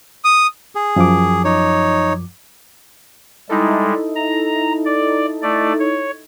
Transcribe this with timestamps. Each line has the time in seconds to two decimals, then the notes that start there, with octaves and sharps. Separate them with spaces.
0.24 D#6
0.75 G#4
0.96 F#2 F3 D6
1.45 D#4 C#5
3.49 G3 G#3 D#4 E4 A4
4.15 A#5
4.85 D5
5.42 A3 D5
5.80 C#5